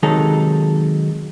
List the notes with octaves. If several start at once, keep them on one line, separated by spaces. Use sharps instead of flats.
C3 D#3 F#3 G#3 D#4 A4